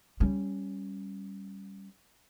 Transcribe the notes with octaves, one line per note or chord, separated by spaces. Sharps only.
G3 C#4